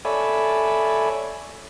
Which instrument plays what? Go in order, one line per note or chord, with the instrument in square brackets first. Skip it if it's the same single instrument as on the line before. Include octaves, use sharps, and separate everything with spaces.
[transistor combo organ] A4 C#5 D5 E5 G#5 B5